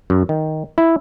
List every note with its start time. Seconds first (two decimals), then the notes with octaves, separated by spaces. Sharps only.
0.10 F#2
0.29 D#3
0.78 E4